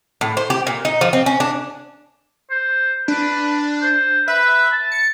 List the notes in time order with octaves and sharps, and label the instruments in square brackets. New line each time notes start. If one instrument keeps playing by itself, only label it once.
[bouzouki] A2
C5
G4
A#2
D#4
F3
C4
C#4
D4
[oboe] C5
[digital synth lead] D4 [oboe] B4
[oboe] C5
[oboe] B4 [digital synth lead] E5
[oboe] A5
[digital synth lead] C#7